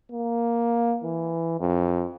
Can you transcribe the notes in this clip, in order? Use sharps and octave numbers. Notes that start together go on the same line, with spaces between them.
A#3
E3
F2